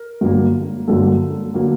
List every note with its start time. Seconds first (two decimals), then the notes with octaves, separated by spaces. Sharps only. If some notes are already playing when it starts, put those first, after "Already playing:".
Already playing: A#4
0.21 G2 D3 F#3 A#3
0.87 G2 D3 F#3 A#3 A4
1.54 D3 F#3 A#3